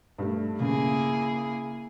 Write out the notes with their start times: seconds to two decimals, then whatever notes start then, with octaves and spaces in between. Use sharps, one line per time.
0.18 G2 A3
0.60 C#3 A#3 E4 G#4